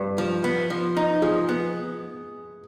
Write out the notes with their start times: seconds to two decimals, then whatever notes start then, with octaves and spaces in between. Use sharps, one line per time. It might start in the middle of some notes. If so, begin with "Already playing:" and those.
Already playing: G2 B4
0.18 F3
0.44 B3
0.70 F3
0.97 D#4
1.22 F3 G#4
1.49 B3